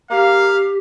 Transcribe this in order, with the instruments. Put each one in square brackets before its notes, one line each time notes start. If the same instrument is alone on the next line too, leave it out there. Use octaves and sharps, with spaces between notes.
[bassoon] A#3 [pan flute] G4 [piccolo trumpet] F5